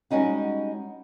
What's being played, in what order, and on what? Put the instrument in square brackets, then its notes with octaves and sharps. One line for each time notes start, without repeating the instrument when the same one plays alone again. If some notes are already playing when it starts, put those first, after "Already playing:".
[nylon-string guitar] G3 G#3 C#4 D#4 F#4